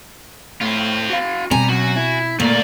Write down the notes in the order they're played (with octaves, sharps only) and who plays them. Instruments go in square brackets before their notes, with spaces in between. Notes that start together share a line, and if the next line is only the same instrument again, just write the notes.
[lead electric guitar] A2 [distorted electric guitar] C4 F4
[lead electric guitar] F#4 F5
[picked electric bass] B2 C4 [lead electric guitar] G3 [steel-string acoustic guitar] G#5 [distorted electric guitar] A#5
[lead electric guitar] F#2 [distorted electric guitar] F#4
[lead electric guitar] E4
[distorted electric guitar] D2 D5 [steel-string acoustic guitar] A#2 [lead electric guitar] A3 A#3